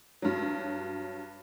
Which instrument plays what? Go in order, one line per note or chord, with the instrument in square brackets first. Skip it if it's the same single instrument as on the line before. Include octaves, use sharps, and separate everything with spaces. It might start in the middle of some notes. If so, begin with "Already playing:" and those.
[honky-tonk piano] G2 F#3